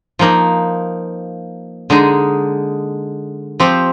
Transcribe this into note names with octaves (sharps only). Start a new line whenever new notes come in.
F3 A#3 D#4
D3 G#3 D#4
F3 C4 G4